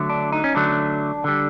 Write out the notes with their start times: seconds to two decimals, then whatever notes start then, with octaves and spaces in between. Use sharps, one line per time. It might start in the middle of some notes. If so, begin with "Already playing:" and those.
Already playing: D3 F#3 A3
0.10 D4
0.32 D#4
0.44 C#4
0.55 D3 F#3 A3 D4
1.24 D3 G3